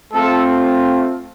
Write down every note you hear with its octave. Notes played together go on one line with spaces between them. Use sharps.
A3 C4 F4 A4